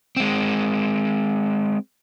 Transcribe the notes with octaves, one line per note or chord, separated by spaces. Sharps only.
G#3 C4